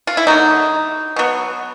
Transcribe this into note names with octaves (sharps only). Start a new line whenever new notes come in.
F4
E4
D3 F#3 A#3 D#4
B2 F#3 B3